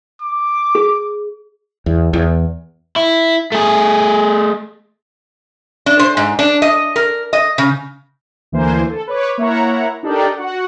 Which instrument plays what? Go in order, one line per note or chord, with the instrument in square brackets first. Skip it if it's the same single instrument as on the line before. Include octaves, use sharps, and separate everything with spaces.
[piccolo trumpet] D6
[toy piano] G#4
[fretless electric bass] E2
E2
[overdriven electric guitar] E4
A3 G#4
[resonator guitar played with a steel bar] D4
C5
G#2
D4
D#5
A#4
D#5
C#3
[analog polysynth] D2 E3 A#3 C5 G#5
A4
B4 C#5 D6
A#3 E4 C#5 F#5 A#5
D4 D#4 G4 A4 A#4 D5
F#4 F#5